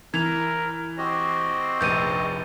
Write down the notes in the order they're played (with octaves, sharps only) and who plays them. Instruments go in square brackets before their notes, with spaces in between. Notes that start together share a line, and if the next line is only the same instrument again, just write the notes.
[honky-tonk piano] E3 [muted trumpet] A#4 [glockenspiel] G#6 F7
[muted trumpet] C4 [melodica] F#4 G4 D#5
[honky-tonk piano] F1 A#1 [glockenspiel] G6 D#7